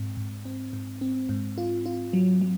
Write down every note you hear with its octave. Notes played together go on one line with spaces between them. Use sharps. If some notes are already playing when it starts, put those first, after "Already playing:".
Already playing: G#2 C4
G#2
C4
G#2
C4
G#2
F4
F4
F#3
F#3